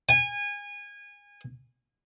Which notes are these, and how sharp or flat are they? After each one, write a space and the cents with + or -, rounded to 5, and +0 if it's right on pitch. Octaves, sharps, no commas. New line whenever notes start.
G#5 -25